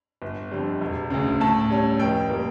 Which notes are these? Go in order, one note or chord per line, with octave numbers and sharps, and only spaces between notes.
G1
F2 D3 G3
E1
D2 C#3
A2 A5
G3 C#4
F1 G5
E3 G3 A#3